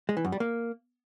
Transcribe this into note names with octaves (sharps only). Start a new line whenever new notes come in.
G#3
E3
F#2
G3
A#3